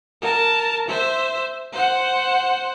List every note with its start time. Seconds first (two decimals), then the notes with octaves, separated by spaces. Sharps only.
0.22 A#4 A5
0.88 C5 E5
1.73 C5 F#5